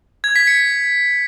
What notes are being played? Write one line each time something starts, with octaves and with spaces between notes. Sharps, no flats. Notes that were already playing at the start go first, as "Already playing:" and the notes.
G#6
B6
C#7